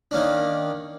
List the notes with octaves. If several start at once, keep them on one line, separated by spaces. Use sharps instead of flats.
D#3 A#3 C#4 D4